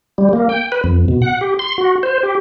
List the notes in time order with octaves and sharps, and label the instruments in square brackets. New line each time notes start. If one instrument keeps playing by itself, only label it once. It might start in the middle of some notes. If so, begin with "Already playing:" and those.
[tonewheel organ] G3
A#3
G5
B4
F2
B2
F#5
G4
C6
F#4
C5
G4